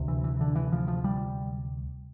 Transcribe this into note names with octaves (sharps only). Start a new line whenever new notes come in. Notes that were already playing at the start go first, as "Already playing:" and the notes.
Already playing: D2 C3
E3
E3
D3
E3
F3
F3
G3